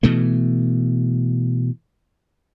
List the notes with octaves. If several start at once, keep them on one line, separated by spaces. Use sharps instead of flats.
B2 E3 A3